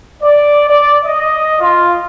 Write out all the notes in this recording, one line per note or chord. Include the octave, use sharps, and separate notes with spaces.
D5
D5
D#5
F4